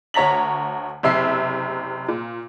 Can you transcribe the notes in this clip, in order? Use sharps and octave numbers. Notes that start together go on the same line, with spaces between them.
D2 C#5 A#5 B6 F#7
F#1 C3 E5 E6 C7
A#2